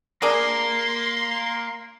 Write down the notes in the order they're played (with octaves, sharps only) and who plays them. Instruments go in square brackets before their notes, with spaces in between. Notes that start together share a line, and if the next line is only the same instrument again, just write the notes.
[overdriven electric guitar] A#3 [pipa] D4 G#4 A#4 [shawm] C6